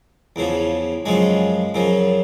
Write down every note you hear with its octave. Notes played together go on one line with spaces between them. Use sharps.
E2 C#3 F3
F#2 C#3 F3 G#3
F#2 C#3 F3